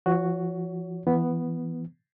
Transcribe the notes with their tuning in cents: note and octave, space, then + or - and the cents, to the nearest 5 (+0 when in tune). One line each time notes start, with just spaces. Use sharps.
F3 -30 F#4 +0 C#5 +25
E3 +15 B3 +0